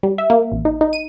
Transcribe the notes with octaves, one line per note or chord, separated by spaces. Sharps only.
G3
E5
A#3
A1
D#4
D#4
D#7